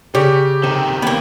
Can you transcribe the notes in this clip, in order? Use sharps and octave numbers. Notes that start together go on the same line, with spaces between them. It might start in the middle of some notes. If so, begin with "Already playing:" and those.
C#3 G4 C#5 D5
C3 D#3 C4 A4
C#3 A#3 B3 B4